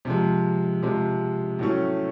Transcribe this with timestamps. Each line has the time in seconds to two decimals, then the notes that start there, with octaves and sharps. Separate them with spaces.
0.05 C3 F3 G#3
0.82 C3 F3 G#3
1.59 A2 F#3 A3 C#4